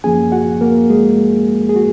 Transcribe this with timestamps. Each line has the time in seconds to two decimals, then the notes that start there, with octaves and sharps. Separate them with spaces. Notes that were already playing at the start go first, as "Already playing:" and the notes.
0.04 F#2 F3 A#3 C#4 G#4 G#5
0.32 F#4 F#5
0.61 A#3 A#4
0.90 G#3 G#4
1.69 G#4
1.76 F#4